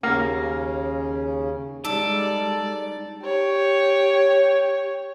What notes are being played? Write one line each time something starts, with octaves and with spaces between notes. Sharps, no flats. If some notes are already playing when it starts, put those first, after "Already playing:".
D#2 C#3 A#3 C#4
G3 G#3 D#4 A4 D5
G4 C#5